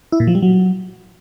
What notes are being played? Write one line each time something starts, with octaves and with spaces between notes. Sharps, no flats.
E4
A#2
F3
G3
F#3